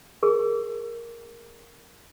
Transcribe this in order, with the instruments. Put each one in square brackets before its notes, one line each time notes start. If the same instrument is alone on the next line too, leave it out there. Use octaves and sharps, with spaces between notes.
[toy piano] G#4 A#4